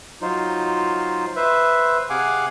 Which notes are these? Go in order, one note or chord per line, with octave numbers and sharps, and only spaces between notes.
F#3 D#4 F4 C5
B4 C5 E5
C3 G#4 F5 F#5 G#5 D6